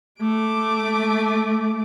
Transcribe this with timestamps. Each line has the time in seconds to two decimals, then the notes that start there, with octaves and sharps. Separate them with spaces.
0.21 A3 D6